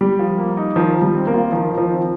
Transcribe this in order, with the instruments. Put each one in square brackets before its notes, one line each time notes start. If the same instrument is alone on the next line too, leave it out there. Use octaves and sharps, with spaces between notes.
[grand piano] G3 [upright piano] G4
[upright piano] F3
A#3
D#4
[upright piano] D#3 [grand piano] F3
[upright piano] D#3
[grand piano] G3
[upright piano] C4
[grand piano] A#3
[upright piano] F4
[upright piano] D#3 [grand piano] F3
[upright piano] D#3
[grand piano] F3
[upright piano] C4